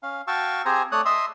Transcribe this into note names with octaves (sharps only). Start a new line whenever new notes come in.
C#4 F5
F#4 F5 G5 A5 C#6 E6
C4 G4 G#4 C5 G#5 A#5
A3 C#5 D5 D#6 F#6
D#5 E5 C6 D#6 E6